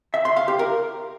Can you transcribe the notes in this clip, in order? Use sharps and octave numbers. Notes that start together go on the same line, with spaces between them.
E5
C6
F5
G4
A#4